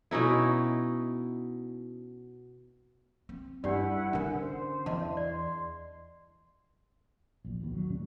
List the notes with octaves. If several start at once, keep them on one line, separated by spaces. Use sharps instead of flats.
B2 C#4 D#4 E4
C4
G2 D4 E4 G4 B4 D5 F#5
D3 C#4 D4 A#4
C5
E2 D#5 A5
D5 C6
D1 A#1
E1 D#2 B2 D#3
F#3
G#2 D3 G#3 C#4